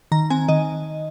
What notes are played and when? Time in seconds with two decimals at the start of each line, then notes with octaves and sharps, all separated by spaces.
0.12 D#3 A#5
0.30 C4 G#5
0.49 D#3 D#5